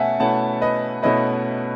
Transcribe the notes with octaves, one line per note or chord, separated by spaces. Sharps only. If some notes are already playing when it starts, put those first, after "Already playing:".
Already playing: B2 A3 C#4 E5 F#5 G#5 A5
B2 A3 C#4 E4 F#5 A5
B4 D#5
B2 A3 C#4 E4 B4 D#5